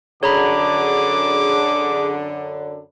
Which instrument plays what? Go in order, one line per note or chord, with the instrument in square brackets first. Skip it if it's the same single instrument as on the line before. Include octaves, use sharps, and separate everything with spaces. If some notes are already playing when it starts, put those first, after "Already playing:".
[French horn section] F#2 D3 D4 [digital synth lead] G#4 [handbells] C#5 A#5 B5 [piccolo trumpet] D6